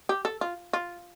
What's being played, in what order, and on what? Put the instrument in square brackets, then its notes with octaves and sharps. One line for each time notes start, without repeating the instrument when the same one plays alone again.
[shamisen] G4
A4
F4
F4